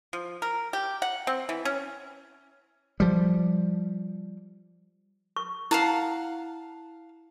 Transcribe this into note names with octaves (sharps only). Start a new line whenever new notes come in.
F3
A#4
G4
F#5
C4
E3
C#4
F3 G3
C#6
E4 F5 F#5 A5 A#5